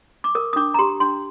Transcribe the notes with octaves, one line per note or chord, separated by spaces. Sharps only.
D6
A#4 D#6
D#6
D4 D6
A#5
G4 C6
D4 C6